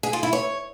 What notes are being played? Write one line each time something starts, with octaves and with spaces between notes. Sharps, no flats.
G#4
F4
E4
C#5